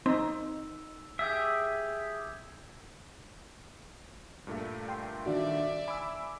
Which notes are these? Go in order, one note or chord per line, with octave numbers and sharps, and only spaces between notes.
C4 D#4 E6
G4 G#4 E5 E6 G6 G#6
G2 A#2 A3
G5 C6
D#3 D4 F#4 D5 E5
G#5 B5 D6 E6